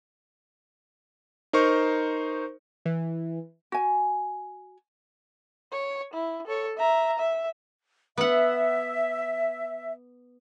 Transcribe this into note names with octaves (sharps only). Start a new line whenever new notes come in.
D#4 A#4 C5 C#6
E3
F#4 G#5
C#5
E4
A4 C#5
E5 A#5
E5
B3 E5 F#5